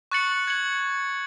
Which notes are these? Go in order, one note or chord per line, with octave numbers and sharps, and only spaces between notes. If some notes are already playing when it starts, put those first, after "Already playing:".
C#6 F#6 A6 C#7 F#7
G#6 C#7 F#7